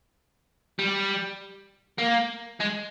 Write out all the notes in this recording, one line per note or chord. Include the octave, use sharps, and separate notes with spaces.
G3
A#3
G#3